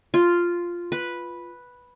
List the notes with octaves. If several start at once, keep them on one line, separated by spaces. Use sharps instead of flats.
F4
B4